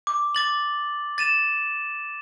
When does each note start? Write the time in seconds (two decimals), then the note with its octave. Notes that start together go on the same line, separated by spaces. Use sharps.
0.07 D6
0.35 D6 A6 F#7
1.18 A6 D#7 E7